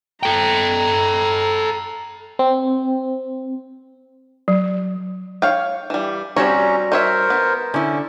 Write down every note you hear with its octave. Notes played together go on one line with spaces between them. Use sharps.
A4 G5 A#5
C4
F#3
C#5 F5 G5
E3 G3
G3 C4 C#4 F#4 G4 C#5 A#5
D#4 A#4 C5 C#5 E5
B3
D3 C#4 E4